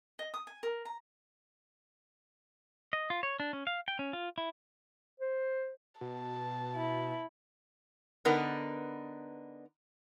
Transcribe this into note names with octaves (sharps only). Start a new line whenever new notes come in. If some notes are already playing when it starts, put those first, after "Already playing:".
D#5
D#6
G#5
A#4
A#5
D#5
F4
C#5
D4
C#4
F5
G5
C#4
F4
E4
C5
B2 A5
E4
D3 B3 D4 D#4 A#4 B4